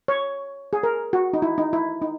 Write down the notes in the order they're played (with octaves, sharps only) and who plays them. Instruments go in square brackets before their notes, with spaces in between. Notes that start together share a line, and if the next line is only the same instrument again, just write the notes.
[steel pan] C#5
G#4
A#4
F#4
D#4
E4
D#4
E4
D#4